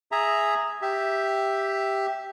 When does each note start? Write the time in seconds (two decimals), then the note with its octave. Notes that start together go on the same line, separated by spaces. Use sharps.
0.12 G#4 E5 A#5
0.82 G4 E5